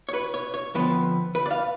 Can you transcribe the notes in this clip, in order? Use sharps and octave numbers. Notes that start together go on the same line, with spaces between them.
C#5
B4
C#5
C#5
F2 D3 F3 B3 B4
B4
D5
F5